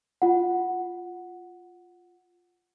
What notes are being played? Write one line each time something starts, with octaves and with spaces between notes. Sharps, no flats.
F4 F#5